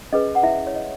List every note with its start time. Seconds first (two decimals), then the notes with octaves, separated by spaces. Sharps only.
0.12 C#4 G#4 B4 D#5
0.35 F#5
0.43 E4 E5
0.67 C#5
0.75 D#5